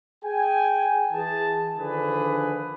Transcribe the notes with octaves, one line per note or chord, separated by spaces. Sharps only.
G#4 G5 G#5
E3 G#4 A5
D3 D#3 F3 D4 G#4 B4